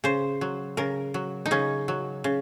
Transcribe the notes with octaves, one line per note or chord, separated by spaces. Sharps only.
C#3 C5
F#3
C#3 A#4
F#3
D#4
C#3 C#4
F#3
C#3